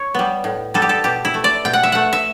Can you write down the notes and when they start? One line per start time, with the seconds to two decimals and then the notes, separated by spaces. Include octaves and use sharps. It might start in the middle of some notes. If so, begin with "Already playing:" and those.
Already playing: C#5
0.14 G3 B3
0.44 A2
0.74 G3 B3 A4
0.82 G4
0.89 A4
1.04 B2 G4
1.25 E4
1.34 A3
1.44 D5
1.65 B2 G5
1.73 F#5
1.83 E5
1.92 A3 F#5
2.13 E5